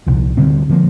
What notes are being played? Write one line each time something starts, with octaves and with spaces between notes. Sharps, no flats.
C2 A#2 F3
D2 D3 G3 C4
D3 F3 A#3